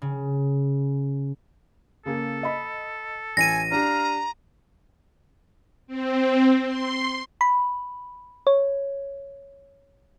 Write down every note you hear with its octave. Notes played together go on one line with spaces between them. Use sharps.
C#3
C#3 A#3 G#4 A4
D#5 B5
A1 G#5 A#6 D#7
D4 G4 F5 A#5
C4
C6
B5
C#5